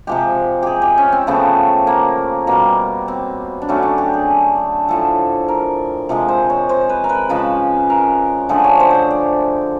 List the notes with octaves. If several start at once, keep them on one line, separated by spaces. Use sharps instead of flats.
C3 F3 G#3 G4
G4 G#4
G4
C#4
C4
C#3 F3 A3 B3
A#3
B2 G3 A#3
C4
D4
D3 F#3 A3 C#4
D4
G4
G#4
A2 F3 A3 A4
A#4
C3 F3 G#3
C5
C#5
C5
B4
A#4
B4
C#3 F3 G#3 B4
A#4
D3 F3 A3 G#4
C#5
C5
C5 C#5
D5